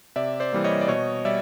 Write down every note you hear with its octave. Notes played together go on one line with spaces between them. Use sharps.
C3 D5 E5
C5 D5
E3 G3 A#3
C#5 D#5
D5
B2 C#5 D#5
G3 D5 E5